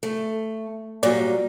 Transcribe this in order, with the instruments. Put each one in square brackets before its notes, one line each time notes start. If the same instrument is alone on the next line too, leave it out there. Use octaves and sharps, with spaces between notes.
[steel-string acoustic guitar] A3
[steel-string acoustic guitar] A#2 F#3 G3 [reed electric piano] D5